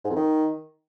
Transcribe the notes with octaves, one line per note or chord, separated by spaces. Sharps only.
G#2
F2
D#3